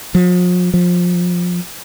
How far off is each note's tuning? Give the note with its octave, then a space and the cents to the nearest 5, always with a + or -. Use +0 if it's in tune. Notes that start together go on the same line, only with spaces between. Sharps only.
F3 +45
F3 +20